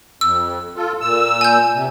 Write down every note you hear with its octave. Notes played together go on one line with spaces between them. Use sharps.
F2 E6
F4 A4
A#2 E6
G#5 G6
C3